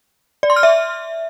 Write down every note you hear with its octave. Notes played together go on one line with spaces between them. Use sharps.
D5
C6
F6
E5